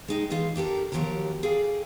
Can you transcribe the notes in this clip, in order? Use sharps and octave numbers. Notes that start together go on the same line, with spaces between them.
G#3 D#4 G5
E3 G#3 D#4 F4
D4 G4 A4 A#4
D#2 A2 F3 F#3 G4 A#4
G#4 A4 D5 F5 G5